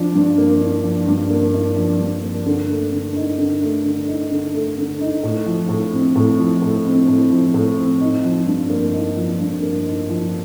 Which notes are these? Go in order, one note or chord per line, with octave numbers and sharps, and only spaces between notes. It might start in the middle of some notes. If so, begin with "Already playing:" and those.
Already playing: F3 D4
G2
A#3
D4
F3
G2
A#3
D4
F3
G2
A#3
D3
A3
D3
D#4
D3
A3
D3
D#4
D3
A3
D3
D#4
A2
F3
A2
C4
A2
F3
A2
C4
A2
F3
A2
C4
D#4
F3
G2
A#3
D#4
F3
G2
A#3
D#4
F3